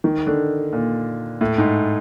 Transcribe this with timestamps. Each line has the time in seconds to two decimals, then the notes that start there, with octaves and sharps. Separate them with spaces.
0.04 D#3
0.27 D3
0.73 A#2
1.41 A2
1.58 G#2